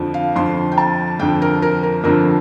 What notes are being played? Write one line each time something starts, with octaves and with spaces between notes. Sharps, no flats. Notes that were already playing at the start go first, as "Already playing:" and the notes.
Already playing: F2 D3 F3
F5
F2 D3 F3 C6
G5
A5
F2 D3 F3 G5
A#4
A#4
A#4
F2 D3 F3 A#4